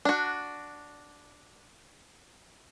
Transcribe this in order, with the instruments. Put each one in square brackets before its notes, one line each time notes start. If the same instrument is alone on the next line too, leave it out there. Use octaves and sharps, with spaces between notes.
[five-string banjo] D4 F#4